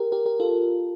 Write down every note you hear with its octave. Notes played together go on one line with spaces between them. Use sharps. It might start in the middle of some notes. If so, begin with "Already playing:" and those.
Already playing: G4 A#4
G4 A#4
G4 A#4
F4 A4